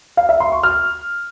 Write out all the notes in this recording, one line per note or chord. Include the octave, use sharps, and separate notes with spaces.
F5
E5
C6
C#6
F6